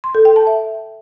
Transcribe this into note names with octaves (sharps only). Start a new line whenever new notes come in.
C6
A4
G5
A5
E5